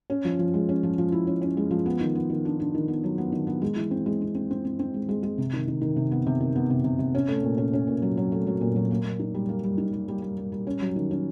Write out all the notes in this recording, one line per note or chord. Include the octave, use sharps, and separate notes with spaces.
C#4
F3
F3
G#3
C#4
F3
F3
E4
C#4
C#4
G#3
F3
B3
D#3
B3
D#3
D4
D4
D#3
B3
F#3
B3
D#3
B3
G#3
E3
C4
G#3
C4
C4
C4
C4
C4
G#3
G#3
G#3
C3
D#3
D#3
D#3
C3
B3
C3
D#3
B3
C3
C3
C3
C#4
A3
A#2
C#4
C#4
A#2
F#3
F#3
A3
F#3
A#2
F#3
A#3
A#3
D#4
G3
A#3
G3
D#4
G3
G3
G3
G3
G3
C#4
F#3
D#3
C#4